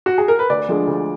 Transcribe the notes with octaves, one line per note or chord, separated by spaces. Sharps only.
F#4
G#4
A#4
B4
D2 D5
D3 F3 G#3
D2